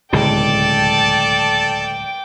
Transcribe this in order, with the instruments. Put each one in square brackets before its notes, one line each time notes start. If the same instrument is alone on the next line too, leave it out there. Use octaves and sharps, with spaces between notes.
[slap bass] D1 C#2 B2 [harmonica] A4 D5 A5 [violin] G5 D6